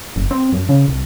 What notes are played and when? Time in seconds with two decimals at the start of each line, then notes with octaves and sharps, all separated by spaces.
0.16 F#1
0.31 C4
0.53 F#2
0.69 C#3
0.88 C2